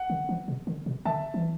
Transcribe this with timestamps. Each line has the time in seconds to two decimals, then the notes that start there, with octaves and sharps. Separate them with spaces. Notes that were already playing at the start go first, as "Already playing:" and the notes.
Already playing: F#5
0.10 D3
0.29 E3
0.48 B2
0.67 D3
0.86 B2
1.05 D3 E5 A5
1.34 E3